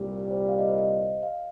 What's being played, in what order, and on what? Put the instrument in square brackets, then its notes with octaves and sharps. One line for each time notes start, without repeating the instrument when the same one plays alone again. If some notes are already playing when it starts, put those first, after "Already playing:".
Already playing: [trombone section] C2 A#2 G3 [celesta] G4 A#4
[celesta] A#4
C5
F5
D#5
C5
D#5
F5